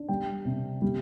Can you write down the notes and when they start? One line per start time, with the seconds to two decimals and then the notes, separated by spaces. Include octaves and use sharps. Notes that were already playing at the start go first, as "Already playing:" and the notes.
Already playing: D4
0.09 G3 G5
0.45 C3
0.82 G3